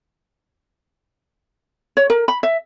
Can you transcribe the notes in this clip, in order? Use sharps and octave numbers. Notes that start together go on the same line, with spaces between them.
C#5
A#4
B5
E5